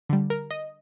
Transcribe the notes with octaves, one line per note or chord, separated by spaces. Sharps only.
D3 G3
A#4
D#5